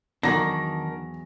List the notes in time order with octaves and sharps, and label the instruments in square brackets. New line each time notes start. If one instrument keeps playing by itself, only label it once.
[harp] E2 F#3 C#6 [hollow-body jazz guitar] D#3 D4 [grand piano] F#4 A#5 [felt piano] A#6